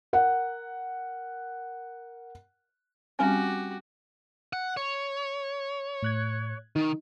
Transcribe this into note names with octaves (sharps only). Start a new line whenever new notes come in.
A#4 F#5
G3 C4 C#4 F#4 G4 G#5
F#5
C#5
A2 F#6 G#6
D#3 D#4